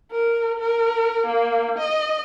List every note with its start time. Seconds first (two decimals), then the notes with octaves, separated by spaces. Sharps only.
0.11 A#4
0.59 A#4
1.26 A#3
1.79 D#5